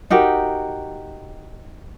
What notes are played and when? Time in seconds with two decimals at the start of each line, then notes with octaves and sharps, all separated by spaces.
0.10 D#4 F#4 G4 A#4